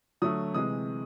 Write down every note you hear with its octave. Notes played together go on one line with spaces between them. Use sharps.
D3 F#3 A3 D#6
C3 E3 G#3 D#6